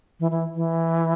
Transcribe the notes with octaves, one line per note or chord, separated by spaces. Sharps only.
E3
E3
E3